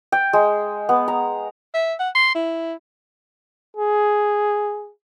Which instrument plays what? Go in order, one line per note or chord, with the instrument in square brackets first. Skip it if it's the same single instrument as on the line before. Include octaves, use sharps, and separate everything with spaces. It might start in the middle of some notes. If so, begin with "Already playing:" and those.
[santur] G5
G#3
B3
A#5
[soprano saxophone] E5
F#5
C6
E4
[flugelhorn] G#4